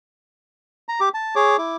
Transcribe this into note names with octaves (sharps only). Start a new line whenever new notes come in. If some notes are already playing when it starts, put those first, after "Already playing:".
A#5
G4 D6
A5
G#4 C#5 D6
E4 D6